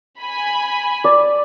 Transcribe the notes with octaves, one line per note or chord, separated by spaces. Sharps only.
G#5 B5
D5